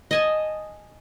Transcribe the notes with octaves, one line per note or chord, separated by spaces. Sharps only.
D#5 G#5 A5